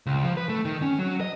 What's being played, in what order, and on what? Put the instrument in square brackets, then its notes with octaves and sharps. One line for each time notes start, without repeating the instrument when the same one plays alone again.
[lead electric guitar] C#2
F3
B4
A3
D#3
C#4
F#3
D#5